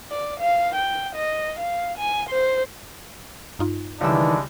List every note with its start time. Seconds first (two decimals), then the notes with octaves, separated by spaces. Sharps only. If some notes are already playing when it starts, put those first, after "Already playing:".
0.11 D5
0.40 F5
0.75 G5
1.15 D#5
1.59 F5
1.98 G#5
2.29 C5
3.59 G2 D#4 F4
4.01 C#2 D#3 E3 G3 G#3 D4 E4 E6